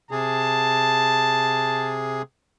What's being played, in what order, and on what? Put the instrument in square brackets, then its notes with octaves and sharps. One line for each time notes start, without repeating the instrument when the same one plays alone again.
[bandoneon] C3 G#4 [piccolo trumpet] A5